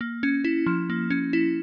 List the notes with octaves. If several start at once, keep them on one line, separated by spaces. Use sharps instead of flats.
A#3
C#4
E4
F3
A#3
C#4
E4